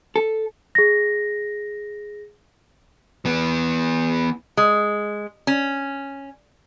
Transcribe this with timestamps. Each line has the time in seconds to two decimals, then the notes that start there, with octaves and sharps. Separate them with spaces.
0.16 A4
0.75 G#4 A#6
3.25 E3 B3
4.57 G#3
5.47 C#4